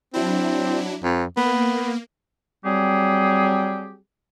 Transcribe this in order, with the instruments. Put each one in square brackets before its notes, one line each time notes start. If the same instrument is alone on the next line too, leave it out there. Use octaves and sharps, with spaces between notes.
[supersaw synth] F#3 D4 E4 [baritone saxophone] C4
[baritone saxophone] F2
[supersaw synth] A#3 [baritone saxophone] B3
[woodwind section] F#3 G3 C4 G4 G#4